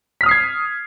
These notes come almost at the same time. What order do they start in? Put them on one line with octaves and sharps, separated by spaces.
B6 F6 D#6 C7 G#6